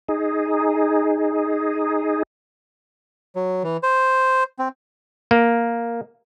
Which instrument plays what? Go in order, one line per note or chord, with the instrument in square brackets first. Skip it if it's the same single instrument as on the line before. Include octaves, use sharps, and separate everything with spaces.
[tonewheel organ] D#4 G#4
[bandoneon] F#3
E3
C5
C4
[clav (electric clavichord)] A#3